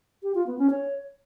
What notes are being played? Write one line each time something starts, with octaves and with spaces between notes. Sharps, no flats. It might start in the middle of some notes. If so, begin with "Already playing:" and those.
G4
F4
B3
C#4
C#5